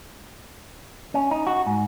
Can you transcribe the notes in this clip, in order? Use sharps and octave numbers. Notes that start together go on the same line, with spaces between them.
C#4
D#4
F#4
G#2